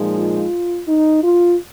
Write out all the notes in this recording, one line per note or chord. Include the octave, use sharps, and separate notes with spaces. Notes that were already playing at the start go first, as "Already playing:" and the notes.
Already playing: A#2 F3 G#3 D#4
F4
D#4
F4